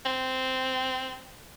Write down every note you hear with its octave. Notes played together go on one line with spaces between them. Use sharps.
C4